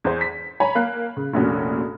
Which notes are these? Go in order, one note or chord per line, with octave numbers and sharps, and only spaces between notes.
E2 C5
B6
C#5 G#5 A#5 B5
A#3 F5 F#6
C#3
F1 A#1 A#2 C#4 F#4